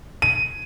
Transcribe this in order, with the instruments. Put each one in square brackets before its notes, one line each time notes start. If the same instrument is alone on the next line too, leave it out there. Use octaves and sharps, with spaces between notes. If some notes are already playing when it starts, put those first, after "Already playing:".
[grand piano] D#7